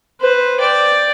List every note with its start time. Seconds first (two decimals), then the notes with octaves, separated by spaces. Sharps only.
0.21 B4 C5
0.60 D5 G5